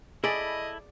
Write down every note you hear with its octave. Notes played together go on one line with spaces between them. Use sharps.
E4 G#4 A4 D5 D#5 B5